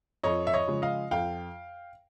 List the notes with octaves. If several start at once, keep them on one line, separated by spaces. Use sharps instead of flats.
F2 C#5 D#5
E5
C#5 D#5
C#3 F3 G#3
D#5 F5
F2 F5 G5